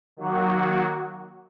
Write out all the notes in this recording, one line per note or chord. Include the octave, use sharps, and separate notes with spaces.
D#3 F#3 A#3 F#4